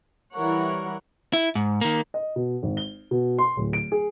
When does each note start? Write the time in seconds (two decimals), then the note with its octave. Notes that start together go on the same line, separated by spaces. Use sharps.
0.34 E3 G3 A#4 C#5 F#5
1.33 E4
1.55 G#2
1.81 D#3 A#3
2.14 D#5
2.36 B2
2.63 G#1
2.77 G7
3.11 B2
3.38 C6
3.57 D1
3.73 D7
3.92 G#4